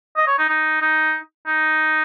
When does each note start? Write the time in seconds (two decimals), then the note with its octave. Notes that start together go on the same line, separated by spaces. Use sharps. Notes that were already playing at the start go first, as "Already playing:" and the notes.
0.17 D#5
0.27 C#5
0.38 D#4
0.49 D#4
0.82 D#4
1.47 D#4